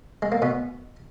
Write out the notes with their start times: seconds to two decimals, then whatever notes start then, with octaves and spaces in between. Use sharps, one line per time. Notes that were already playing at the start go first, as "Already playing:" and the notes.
0.22 G#3
0.32 A#3
0.42 B2 B3